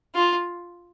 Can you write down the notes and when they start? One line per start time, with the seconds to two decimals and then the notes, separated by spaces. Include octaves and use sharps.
0.15 F4